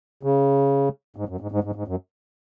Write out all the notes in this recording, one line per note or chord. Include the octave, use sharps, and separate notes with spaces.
C#3
G#2
F#2
G#2
G#2
G#2
G#2
F#2